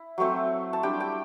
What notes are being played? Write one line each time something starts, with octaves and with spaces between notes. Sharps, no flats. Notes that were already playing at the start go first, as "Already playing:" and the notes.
Already playing: E4
F#3 A3 C4
A5
G3 D4 G5
G5